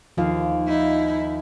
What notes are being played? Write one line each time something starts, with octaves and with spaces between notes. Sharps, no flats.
D#2 F3 F4 F5
D#4 E4